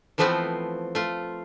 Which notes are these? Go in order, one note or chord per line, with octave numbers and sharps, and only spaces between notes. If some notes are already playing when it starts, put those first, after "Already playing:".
E3 F3 A3 B3 C4 F4
A3 F4